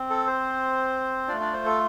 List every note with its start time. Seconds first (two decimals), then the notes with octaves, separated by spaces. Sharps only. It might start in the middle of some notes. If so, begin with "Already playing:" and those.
Already playing: C4
0.10 A4
0.27 C5
1.28 A3 D4 F4 D5
1.40 D4 D5
1.53 C5
1.66 A4